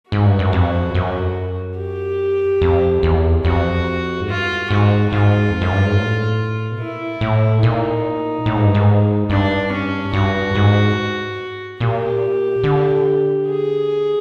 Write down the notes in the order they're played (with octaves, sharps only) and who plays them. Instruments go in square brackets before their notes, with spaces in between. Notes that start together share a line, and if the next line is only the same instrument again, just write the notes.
[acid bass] G#2 [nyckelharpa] F#4
[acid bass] G2
F#2
F2
F#2
[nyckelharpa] G4
[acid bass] F2
E2
[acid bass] F2 [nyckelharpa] F#4
[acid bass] G#2
[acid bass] G2 [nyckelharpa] F4
[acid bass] G#2 [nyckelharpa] F#4
[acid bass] G#2 [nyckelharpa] F4
[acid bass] F2
F#2
G2
G#2
A2
B2
[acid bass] A#2 [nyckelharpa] E4
[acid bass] A2
[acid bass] A#2 [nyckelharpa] D#4
[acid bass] A2
G#2
G2
G#2
[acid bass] G2 [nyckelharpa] D4
[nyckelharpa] C#4
[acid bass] G2 [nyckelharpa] F#4
[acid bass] G#2
[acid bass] A#2 [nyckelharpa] G4
[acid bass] D3
[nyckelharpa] G#4